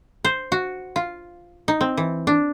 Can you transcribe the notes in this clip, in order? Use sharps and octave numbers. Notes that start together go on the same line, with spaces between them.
C5
F#4
F4
D#4
C4
E3
D4